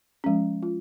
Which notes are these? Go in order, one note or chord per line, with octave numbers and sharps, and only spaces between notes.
F3 G#3 C#4
F4